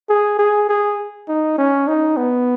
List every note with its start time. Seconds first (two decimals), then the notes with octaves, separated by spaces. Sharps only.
0.09 G#4
0.39 G#4
0.69 G#4
1.28 D#4
1.58 C#4
1.88 D#4
2.17 B3